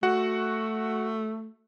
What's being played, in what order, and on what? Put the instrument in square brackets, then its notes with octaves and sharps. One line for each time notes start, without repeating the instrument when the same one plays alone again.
[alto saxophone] A3 [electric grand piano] F#4 F#5